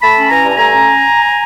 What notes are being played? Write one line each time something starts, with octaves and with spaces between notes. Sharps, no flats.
A3 A5 B5
C#4
E3 G#5 A#5
G2
A5
A3 G#5 A#5
C#4